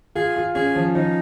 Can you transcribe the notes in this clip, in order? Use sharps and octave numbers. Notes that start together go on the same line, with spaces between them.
F4 G#4
F4
C#4 G#4
F3
F3 D#4